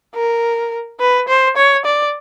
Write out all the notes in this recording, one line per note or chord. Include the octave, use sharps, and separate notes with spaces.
A#4
B4
C5
C#5
D5